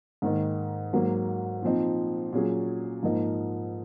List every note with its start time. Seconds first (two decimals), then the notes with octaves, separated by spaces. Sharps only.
0.22 G#2 D#3 A#3 D#4
0.93 G#2 F#3 A#3
1.62 A#2 F3 C4 D#4
2.33 A#2 F#3 C#4 G#4
3.03 G#2 F3 A#3 D#4